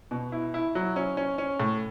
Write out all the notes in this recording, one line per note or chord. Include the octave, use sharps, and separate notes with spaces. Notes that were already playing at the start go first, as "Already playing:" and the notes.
B2
E4
E4
F#3
C#4
C#4
C#4
A2